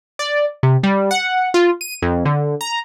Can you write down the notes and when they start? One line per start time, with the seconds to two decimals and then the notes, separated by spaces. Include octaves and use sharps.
0.19 D5
0.63 C3
0.83 G3
1.11 F#5
1.54 F4
1.81 D#7
2.02 F2
2.25 D3
2.61 A#5